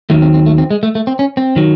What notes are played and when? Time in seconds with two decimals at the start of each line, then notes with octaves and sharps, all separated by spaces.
0.10 D#2 D#3 F#3 A3
0.22 C4
0.34 C4
0.46 A3
0.58 C4
0.71 G#3
0.83 A3
0.95 A3
1.07 C4
1.19 C#4
1.37 C4
1.56 D#3 F#3